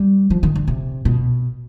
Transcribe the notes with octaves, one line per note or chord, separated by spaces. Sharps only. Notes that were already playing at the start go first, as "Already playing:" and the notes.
Already playing: G3
F3
D#3
D3
C3
B2